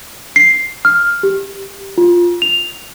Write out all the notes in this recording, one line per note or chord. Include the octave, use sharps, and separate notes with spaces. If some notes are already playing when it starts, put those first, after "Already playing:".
C7
F6
G4
F4
F7